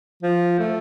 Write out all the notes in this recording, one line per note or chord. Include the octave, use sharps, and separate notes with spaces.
F3
A3